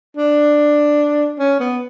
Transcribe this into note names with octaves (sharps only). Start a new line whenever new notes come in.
D4
C#4
B3